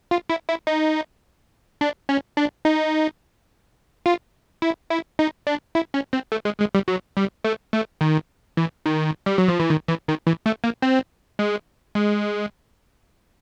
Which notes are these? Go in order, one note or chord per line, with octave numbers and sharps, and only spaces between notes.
F4
E4
E4
D#4
D4
C#4
D4
D#4
F4
E4
E4
D#4
D4
E4
C#4
C4
A3
G#3
G#3
G3
F#3
G3
A3
A3
D#3
E3
D#3
G3
F#3
F3
E3
D#3
E3
D#3
E3
A3
A#3
C4
G#3
G#3